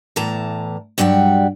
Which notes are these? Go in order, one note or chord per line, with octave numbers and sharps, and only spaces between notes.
E2 A2 E3 A5 A#5
G2 F#3 G3 F#5 G5